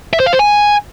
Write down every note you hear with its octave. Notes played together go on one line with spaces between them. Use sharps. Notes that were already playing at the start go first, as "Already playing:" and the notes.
E5
C5
F5
C5
G#5